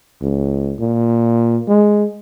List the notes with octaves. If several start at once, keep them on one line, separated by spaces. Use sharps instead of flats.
C#2
A#2
G#3